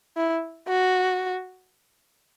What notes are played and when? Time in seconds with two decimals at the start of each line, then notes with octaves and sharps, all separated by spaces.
0.17 E4
0.68 F#4